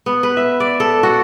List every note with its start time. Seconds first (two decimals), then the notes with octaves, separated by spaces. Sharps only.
0.06 B3
0.23 B4
0.37 E5
0.60 D5
0.80 A4
1.03 F#4